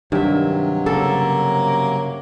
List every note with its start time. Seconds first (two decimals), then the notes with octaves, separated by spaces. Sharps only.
0.12 G2 C3 D#3 F#3 E5
0.86 C#3 A#3 A4